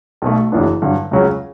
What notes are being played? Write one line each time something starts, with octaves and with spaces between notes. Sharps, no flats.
B1 B2 A3
F#1 F#2 E3 B3 D4
G2 D3 F#3
C#2 C#3 F#3 C#4